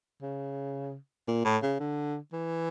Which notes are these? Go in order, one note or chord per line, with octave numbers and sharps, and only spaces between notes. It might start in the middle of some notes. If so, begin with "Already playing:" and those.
C#3
A#2
A2
C#3
D3
E3